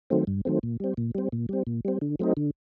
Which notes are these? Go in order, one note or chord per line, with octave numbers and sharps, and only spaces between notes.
D#3 F#3 A3 C4
G2
D#3 F#3 A3 C4
A#2
G3 C4
A#2
G3 C4
A#2
G3 C4
A#2
G3 C4
D3
F#3 A3 C4 D#4
D3